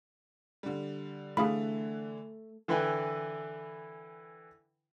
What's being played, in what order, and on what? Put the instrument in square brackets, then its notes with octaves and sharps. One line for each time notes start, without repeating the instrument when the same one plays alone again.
[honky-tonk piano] D3 G3
[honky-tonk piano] D3 E3 [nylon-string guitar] A3 [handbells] G#4 F5 B5
[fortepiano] D3 E3 E4 B4 G5 G#5